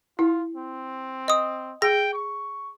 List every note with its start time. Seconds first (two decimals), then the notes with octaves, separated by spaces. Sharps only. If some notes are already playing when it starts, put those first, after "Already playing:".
0.19 E4 F4
0.55 C4
1.28 D#5 D#6
1.82 G#4 G5 A#6
2.13 C#6